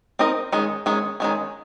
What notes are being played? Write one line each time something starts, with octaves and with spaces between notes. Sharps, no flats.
C4 D#4 A#4 D#5
D#3 G#3 C#4
D#3 G#3 C#4
D#3 G#3 C#4